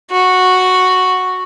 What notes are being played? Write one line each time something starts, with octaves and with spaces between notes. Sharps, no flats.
F#4